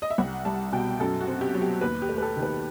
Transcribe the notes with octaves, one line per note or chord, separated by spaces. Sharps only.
D#5
E5
C2 F#5
G3 A5
B2 G5
F#2 A4
F#4
C4
G4
F#3
G4
D#2 B4
G4
A3
B4
A4
D#3
B4